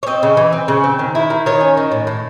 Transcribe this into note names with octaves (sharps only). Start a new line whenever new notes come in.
C#5
C4 D#5
C#3
E3
C4
C#3
C4
D#3
E4
D#3
D#3 C#5
C#4
D#3
A2
A2